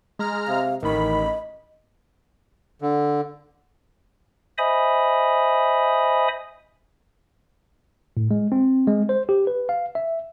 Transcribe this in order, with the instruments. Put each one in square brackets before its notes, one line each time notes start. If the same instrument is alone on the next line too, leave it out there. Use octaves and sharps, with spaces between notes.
[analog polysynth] G#3 A#5 F6
[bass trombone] C3 [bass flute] F5
[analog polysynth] A1 B5 [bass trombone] D#3 [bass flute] D#5
[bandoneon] D3
[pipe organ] C5 D#5 E5 G#5 B5 D#6
[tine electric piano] A2
G#3
C4
G#3
C5
G4
B4
F5
E5